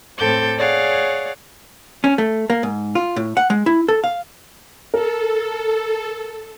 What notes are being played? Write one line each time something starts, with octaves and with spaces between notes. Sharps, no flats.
A2 C4 A4 D6 G6 A6
G#4 C#5 D5 F5 F#5
C#4
A3
A#3
G#2
F4
A2
F#5
G#3
E4
A4
F5
A4 A#4